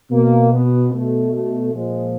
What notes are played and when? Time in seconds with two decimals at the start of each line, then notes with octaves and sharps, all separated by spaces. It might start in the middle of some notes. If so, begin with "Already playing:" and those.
0.10 B2 A#3
0.51 B3
0.91 B2 A3
1.31 A3
1.72 A#2 F3 G#3